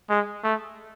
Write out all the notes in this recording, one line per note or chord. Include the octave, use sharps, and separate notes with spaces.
G#3
A3